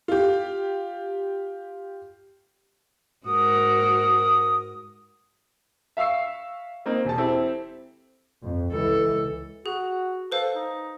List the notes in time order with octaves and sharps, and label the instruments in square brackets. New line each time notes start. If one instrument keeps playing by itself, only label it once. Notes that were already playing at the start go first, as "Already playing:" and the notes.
[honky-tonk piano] F4 G4
[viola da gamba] G#2 F#4 A#4 [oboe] D#6
[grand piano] E5 F5 C#6 E6 C7
A#3 C4 D#4
E1 G#4 A5
C4 E4 G4 A4
[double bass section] F2
[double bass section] C#2 E3 [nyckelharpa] A4
[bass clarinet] F#4 [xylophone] G#4
[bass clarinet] A4 [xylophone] B4 C5 F5
[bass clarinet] D#4